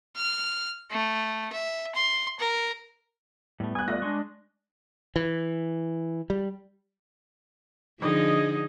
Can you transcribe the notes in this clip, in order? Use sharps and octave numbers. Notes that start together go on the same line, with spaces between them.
F6
A3
E5
C6
A#4
A2 G3 A3 B3
G#5 D#6 F#6
A3 F4 D5 D#5 A#6
G#3 D4 G#5 C6 C#6
E3
G3
D3 F3 D#4 G#4 D#5